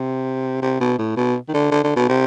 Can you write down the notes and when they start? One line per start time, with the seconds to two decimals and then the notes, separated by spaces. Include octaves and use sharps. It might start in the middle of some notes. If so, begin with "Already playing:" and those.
Already playing: C3
0.62 C3
0.81 B2
0.99 A2
1.17 B2
1.48 D#3
1.54 D3
1.72 D3
1.84 D3
1.96 B2
2.09 C3